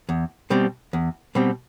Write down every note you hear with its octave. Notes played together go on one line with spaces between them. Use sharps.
E2
B2 G3 C4
E2
B2 G3 C4